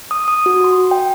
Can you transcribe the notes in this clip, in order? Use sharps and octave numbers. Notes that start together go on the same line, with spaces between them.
D#6
D#6
F#4
C6
G5